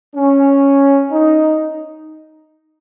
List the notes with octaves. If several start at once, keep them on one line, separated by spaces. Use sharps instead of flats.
C#4
D#4